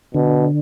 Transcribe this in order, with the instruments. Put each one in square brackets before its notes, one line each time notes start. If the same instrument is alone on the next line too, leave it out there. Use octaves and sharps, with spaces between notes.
[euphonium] B2 [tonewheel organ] D3